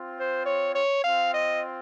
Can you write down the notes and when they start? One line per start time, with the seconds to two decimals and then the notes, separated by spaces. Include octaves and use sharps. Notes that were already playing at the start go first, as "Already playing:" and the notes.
Already playing: C4 F4
0.18 C5
0.46 C#5
0.75 C#5
1.04 C4 F4 F5
1.32 D#5